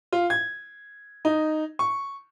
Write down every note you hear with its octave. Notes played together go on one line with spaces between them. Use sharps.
F4
G#6
D#4
C#6